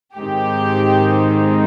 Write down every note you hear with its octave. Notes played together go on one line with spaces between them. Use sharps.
G#2 D#3 G#3 C4 D#4 G4